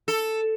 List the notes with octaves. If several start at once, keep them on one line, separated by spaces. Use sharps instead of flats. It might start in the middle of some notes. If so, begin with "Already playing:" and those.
A4